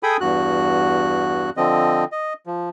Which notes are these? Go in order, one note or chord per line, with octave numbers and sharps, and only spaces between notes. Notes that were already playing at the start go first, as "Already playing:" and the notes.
G#4 A4 G5 G#5 B5 D#6
E2 G2 F#4 F#6
D3 F3 C4 D#5
D#5
F3